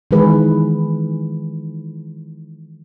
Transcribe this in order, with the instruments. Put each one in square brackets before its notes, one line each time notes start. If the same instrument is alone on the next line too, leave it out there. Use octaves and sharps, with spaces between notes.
[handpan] D#3 E3 G#3 G#4 B4